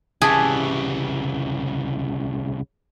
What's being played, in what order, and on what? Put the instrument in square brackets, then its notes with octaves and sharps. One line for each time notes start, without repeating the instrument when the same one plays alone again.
[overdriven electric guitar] C2 C#3 [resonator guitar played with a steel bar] E3 G4 A5 [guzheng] G#4